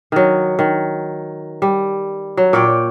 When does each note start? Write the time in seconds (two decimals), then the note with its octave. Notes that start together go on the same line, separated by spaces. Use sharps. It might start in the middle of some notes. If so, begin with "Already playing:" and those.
0.12 D#3 F#3
0.59 D#3
1.62 G3
2.37 F#3
2.53 A#2 C#5 D5 G5